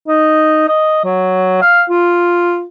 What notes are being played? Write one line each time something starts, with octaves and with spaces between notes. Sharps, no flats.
D#4
D#5
F#3
F5
F4